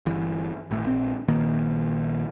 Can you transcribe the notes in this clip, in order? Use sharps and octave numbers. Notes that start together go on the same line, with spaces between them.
G1 E3
G#1 A2
A#1 C4
A#1 D#3 A#3